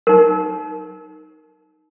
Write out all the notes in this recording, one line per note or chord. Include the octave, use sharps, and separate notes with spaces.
D#4 A#4